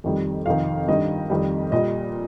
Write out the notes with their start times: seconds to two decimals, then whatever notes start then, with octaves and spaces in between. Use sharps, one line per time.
0.04 F2 D#3 G3
0.46 F2 C3 D#3 F5
0.88 G2 D#3 G3 D#5
1.30 F2 D#3 G3
1.72 A#2 G3 D#5